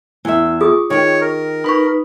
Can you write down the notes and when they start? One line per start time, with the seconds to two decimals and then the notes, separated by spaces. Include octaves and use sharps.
0.25 E2 E4 E5
0.61 F4 G#4 C#6 D#6
0.90 D#3 G4 C#5
1.21 A#4
1.64 D#4 B4 B5 C#6